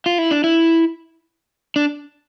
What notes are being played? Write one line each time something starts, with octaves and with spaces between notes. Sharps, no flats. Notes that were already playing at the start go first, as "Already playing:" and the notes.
F4
E4
D4
E4
D4